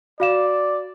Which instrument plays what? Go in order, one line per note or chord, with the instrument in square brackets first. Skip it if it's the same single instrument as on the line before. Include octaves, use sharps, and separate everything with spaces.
[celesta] F#4 F5 E7 [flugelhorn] D5